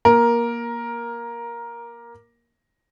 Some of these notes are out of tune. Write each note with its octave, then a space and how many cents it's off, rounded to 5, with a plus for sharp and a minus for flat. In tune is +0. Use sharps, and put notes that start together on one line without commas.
A#3 +20 A#4 +10